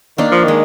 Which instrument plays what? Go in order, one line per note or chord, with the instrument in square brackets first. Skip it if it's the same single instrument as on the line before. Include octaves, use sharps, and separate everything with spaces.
[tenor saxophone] D#3 [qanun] A#3 D4
[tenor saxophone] F3
[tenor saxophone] D#3 [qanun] G#3